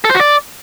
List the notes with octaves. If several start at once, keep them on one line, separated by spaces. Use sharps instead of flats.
A4
C5
F#4
D5